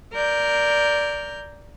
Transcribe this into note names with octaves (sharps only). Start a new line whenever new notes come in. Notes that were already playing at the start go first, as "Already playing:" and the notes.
A#4 D5 F6 G6